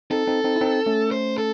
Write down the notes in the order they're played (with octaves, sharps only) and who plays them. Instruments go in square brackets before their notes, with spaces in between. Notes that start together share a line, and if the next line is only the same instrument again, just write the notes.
[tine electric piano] C4 D#4 [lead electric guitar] A4
[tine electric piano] C4 D#4
C4 D#4
E4
C4 D#4
A3 C#4
[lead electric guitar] C5
A4